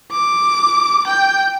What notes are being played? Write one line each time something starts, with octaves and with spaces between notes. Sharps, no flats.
D6
G5